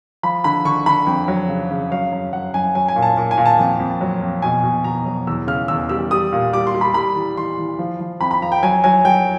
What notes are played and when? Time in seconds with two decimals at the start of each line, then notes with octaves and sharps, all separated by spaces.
0.23 F3 B5
0.44 D3 B5
0.65 D3 C#6
0.86 D3 B5
1.07 F2
1.28 F#3
1.49 C#3
1.71 C#3
1.91 F#3 F5
2.12 F#2
2.33 F#3 F#5
2.54 F#2 G#5
2.75 F#3 G#5
2.88 G#5
2.96 A#2
3.02 A5
3.17 A#2
3.31 G#5
3.37 A#2
3.46 A5
3.59 F2
3.80 F2
4.01 F#3
4.22 F2
4.42 B2 G#5
4.63 B2
4.84 B2 A#5
5.06 F#3
5.27 E2 E6
5.47 C#3 F6
5.68 E2 E6
5.89 G3 E6
6.11 G3 D#6
6.33 A#2
6.53 G3 D6
6.67 C6
6.74 G3
6.81 B5
6.94 G3 B5
7.16 E3
7.37 E3 C6
7.58 E3
7.79 F3
8.00 F3
8.21 F2 B5
8.31 B5
8.42 F3 A#5
8.52 G5
8.63 F#3 G#5
8.84 F#3 G#5
9.05 F#3 G5